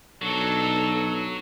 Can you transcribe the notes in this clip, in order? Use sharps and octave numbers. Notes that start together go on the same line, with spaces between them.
B1 F#3 D4 A4